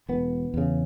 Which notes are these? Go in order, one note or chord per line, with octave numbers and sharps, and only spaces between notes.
E1 B3
E2 C#3